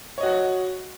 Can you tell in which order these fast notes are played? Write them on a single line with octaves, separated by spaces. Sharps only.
C#5 D#5 F#4 F#5